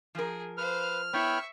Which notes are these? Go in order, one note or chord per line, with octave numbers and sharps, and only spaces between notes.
F3 G#4 A#4
B4 C5 F5 F6
B3 E4 C#5 E5 G5 B5 C#6